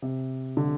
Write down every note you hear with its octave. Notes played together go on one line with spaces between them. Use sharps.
C3
D3